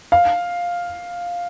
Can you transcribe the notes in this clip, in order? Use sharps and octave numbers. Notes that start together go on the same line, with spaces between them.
F5